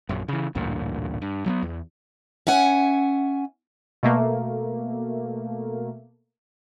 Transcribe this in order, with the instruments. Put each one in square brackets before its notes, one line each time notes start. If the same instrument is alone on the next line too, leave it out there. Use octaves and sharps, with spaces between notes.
[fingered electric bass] A#1 F#2
C#3 E3
A1 D2 G2 A#2
G2
F#3 A3 B3
E2
[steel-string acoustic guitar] C#4 E5 F#5 G#5
[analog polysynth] B2 A3 A#3